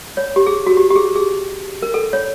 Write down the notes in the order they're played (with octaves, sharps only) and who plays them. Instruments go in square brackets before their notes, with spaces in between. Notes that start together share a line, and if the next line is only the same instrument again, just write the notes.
[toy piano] C#5
G4
G#4
F#4
G4
G4
G#4
G#4
A#4
A4
C#5